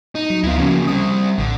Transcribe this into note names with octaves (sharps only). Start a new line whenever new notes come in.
D#4
F#3
D2 B3 E4 F4
C#3 F3 A#3 C#4 F#4
G3 C4 D#6
A1 D3